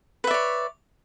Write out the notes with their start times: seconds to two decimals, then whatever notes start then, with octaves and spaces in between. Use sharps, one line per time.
0.24 B4
0.27 E5
0.31 D5
0.34 C#5